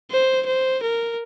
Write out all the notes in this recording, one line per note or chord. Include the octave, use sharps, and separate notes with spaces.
C5
C5
A#4